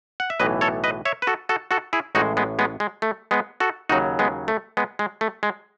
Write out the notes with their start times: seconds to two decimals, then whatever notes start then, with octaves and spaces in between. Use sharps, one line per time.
0.20 F#5
0.30 E5
0.40 B1 A2 E3 B4 D#5
0.61 A4 C#5
0.84 B4 D#5
1.05 C#5 E5
1.22 B4
1.27 F#4 A4
1.49 F#4 A4
1.71 F#4 A4
1.93 E4 G#4
2.15 A1 A2 G#3 D#4 F#4
2.37 G#3 B3
2.59 G#3 B3
2.80 G#3
3.02 A3
3.31 G#3 B3
3.60 F#4 A4
3.89 D#2 C#3 F#3 D#4 F#4
4.19 G#3 B3
4.48 A3
4.77 G#3 B3
4.99 G#3
5.21 A3
5.43 G#3